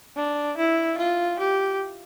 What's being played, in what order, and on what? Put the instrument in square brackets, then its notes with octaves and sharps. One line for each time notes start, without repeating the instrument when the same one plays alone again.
[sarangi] D4
E4
F4
G4